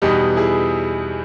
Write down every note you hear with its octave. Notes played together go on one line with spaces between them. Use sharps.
E2 B2 G3 D#4 G4
E4 G#4